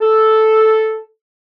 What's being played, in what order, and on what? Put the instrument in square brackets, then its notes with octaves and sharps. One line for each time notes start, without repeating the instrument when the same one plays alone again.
[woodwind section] A4